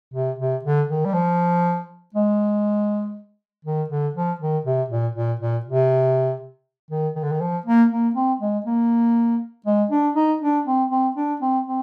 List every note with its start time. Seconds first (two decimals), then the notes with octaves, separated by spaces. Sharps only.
0.14 C3
0.39 C3
0.65 D3
0.89 D#3
1.06 G3
1.14 F3
2.15 G#3
3.65 D#3
3.90 D3
4.15 F3
4.41 D#3
4.65 C3
4.90 A#2
5.16 A#2
5.40 A#2
5.66 C3
6.91 D#3
7.16 D#3
7.24 D3
7.32 D#3
7.41 F3
7.66 A#3
7.91 A#3
8.15 C4
8.41 G#3
8.66 A#3
9.66 G#3
9.91 D4
10.16 D#4
10.42 D4
10.67 C4
10.91 C4
11.16 D4
11.41 C4
11.66 C4